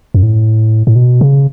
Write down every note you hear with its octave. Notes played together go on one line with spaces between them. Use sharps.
F#2
A2
A2
B2
C#3